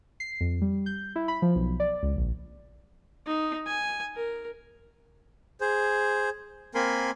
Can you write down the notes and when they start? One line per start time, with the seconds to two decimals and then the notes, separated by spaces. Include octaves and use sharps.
0.20 C7
0.41 F2
0.61 G3
0.86 G6
1.16 E4
1.28 B5
1.42 F3
1.55 B1
1.80 D5
2.03 C#2
2.16 A#1
3.26 D#4
3.66 G#5
4.16 A#4
5.61 G#4 C5
6.75 A#3 C4 A#4 G#5 B5 C6